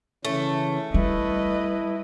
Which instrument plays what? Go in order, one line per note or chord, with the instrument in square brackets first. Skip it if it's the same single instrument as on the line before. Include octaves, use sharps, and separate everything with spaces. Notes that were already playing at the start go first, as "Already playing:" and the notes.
[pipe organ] C#3 E3 C#4 [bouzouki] A3
[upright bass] G3 [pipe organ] E4 [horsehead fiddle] B4 D#5